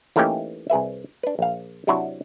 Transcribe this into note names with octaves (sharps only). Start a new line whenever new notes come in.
E3 A3 A#3 C#4 D#4 G4
C2 G#4 B4 E5
D4 B4
A#1 F5
C3 F#3 D4 E4 F#4